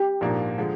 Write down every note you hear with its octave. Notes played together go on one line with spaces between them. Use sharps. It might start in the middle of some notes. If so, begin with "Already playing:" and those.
Already playing: G4
A#1 G#2 F3 A#3 D4
D3 F3 G#3